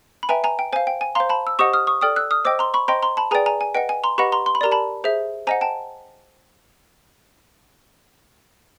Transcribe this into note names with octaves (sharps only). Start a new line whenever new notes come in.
B5
B4 E5 G5 G#5 A#5
G#5 A#5
G5
C5 F5 G#5
G5
G#5
C5 F5 A#5 C6
A5 B5
E6
G4 C5 D#5 F#5 C#6 D#6
D#6 F6
C#6 D#6
A4 D5 G5 D#6 F6
E6 F#6
D#6 F6
C5 D#5 G5 D6 E6
A#5 C6
B5 C#6
C5 D#5 G5 A#5 C6
A#5 C6
A5 B5
G#4 B4 D5 G5 G#5 A#5
G#5 A#5
G#5
B4 D#5 F#5 G5
G#5
A#5 C6
G4 B4 D#5 F#5 B5 C#6
A#5 C6
C6
B5
G4 A#4 D5 A#5
A5 B5
G#4 C5 E5
C5 D#5 F#5 G#5 A#5
G5 A5